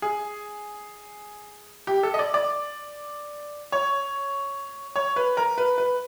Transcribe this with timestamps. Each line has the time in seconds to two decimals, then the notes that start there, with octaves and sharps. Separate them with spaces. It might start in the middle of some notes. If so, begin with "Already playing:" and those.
0.02 G#4
1.87 G4
2.03 A4
2.14 D#5
2.19 D5
2.34 D5
3.72 C#5
4.96 C#5
5.16 B4
5.37 A#4
5.58 B4
5.78 B4